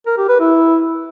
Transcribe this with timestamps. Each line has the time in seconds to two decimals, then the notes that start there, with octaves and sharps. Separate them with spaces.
0.06 A#4
0.18 G4
0.29 B4
0.40 E4